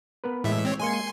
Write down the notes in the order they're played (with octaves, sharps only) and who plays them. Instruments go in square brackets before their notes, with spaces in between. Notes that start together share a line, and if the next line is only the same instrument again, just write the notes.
[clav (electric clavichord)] B3 A#4 B4
[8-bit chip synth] A2 E5 [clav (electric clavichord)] E3 G#3
[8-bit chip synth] C4 C#5
[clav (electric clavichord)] G#3 A#3 [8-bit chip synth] G#5 C6 C#7